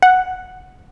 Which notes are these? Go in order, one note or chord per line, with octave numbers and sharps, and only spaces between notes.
F#5